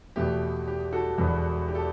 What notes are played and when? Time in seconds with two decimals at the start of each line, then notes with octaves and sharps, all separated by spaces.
0.16 E2 B2 A3 G4
0.67 G4
0.92 F#4 A4
1.18 E1 E2 B2 F#3 B3
1.68 G4
1.75 A4